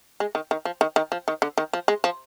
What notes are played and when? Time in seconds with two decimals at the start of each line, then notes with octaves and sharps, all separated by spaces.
0.20 G#3
0.35 D#3
0.51 D#3
0.65 F3
0.81 D#3
0.96 D#3
1.12 F3
1.28 D#3
1.42 D3
1.58 D#3
1.73 F3
1.88 G#3
2.04 F3